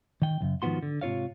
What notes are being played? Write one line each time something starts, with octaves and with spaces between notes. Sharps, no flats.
D#3 G5
C2 F#2 C#3
G#2 D#3 F3 B3 F#4 C6
D3
G#2 C3 F4 C#5 F5